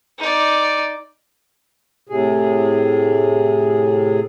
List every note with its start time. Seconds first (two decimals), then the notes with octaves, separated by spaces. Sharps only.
0.18 D#4 D5
2.09 A2 C3 G#4